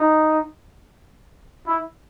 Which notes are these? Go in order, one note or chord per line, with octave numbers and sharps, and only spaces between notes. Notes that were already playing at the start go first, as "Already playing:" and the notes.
Already playing: D#4
E4